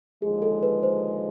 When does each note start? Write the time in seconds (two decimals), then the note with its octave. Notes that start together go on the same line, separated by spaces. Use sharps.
0.22 D#2 D3 F3 G#3 G#4
0.42 A4
0.63 B4
0.83 C5